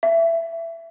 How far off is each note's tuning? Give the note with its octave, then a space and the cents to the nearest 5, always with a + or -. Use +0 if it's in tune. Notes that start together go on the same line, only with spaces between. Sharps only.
E5 +15